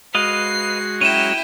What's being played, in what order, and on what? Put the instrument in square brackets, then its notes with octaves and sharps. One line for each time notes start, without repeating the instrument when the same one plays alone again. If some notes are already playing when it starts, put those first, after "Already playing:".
[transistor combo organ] G#3 F#4 [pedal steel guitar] B4 D#5 F5 [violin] C7
[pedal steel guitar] F#3 C#4 [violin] E4 G5 [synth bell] D#7 E7